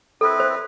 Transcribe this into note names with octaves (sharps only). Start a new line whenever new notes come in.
C4 E4 A4 B4
C5